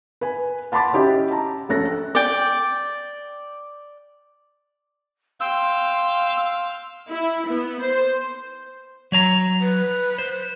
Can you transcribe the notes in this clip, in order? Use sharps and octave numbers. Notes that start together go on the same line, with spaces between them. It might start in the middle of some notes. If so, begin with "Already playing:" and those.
B4 G#5
F#5 A5 B5 C6 D6 A6
C#4 E4 G4 D#5
A5 A#5
A#1 C#4 A4 F#6 A#6
D5 G5
F5 G5 C6 E6
E4
B3
C5
F#3 C#5 A#5
B4
C5